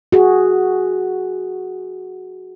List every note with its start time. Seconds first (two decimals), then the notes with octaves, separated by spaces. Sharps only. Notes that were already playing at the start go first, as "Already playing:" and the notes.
0.12 F#4 G#4